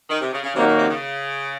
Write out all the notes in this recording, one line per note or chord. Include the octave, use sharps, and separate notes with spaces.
D#3
C3
C#3
C#3
C3 D#3 F#3 A#3 D#4 F#4
A#2
C3
C#3